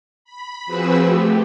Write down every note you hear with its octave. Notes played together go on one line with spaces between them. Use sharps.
B5
F3 C4 F#4 G#4 B4 E6
A3 G4